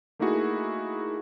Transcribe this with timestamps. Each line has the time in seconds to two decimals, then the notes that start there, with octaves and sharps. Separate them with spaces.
0.19 A3 A#3 D#4 E4 F#4 G#4